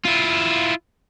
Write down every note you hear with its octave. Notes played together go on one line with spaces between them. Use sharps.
E4 F4